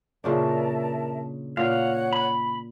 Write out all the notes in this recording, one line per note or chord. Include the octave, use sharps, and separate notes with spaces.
A#2 C#3 D4 A#4 E5 A5
A#2 C#5 F5 F#5
B5